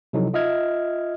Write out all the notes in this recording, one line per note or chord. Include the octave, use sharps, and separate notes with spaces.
C3 F3 F#3 D#4 E4 A4
F4 D#5 E5 F6 G#6